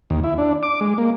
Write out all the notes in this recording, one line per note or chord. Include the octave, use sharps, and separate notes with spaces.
D#2
E4
D4
D6
G#3
A#3